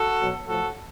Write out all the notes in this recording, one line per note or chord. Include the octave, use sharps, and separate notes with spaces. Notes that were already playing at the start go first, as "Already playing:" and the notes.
Already playing: F#4 A4
B2 F#3
A2 F3 F#4 A4